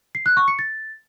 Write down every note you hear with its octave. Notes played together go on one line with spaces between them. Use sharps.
C7
F#6
C#6
C#7
A6